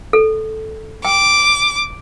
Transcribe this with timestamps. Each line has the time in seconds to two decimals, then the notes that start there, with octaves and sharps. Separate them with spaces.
0.13 A4
1.05 G5 D6